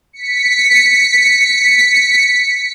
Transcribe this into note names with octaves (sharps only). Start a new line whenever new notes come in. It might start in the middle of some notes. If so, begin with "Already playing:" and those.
B6 C#7